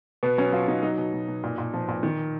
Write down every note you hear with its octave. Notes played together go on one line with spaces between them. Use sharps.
B2 B3
F#3 C#4
F#3 F4
B2 D#4
F#3 D#4
B2
B2
B2
A#2
A#2
F3
A#2
D#3